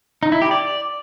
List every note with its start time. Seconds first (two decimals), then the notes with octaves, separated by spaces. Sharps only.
0.23 D#4
0.32 E4
0.42 G4
0.51 D5